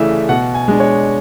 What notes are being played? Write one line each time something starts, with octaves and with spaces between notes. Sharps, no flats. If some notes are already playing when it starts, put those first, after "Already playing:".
Already playing: C#3 E3 A3 D5 E5
B2 F#5
G#5
G#3 D4
C#5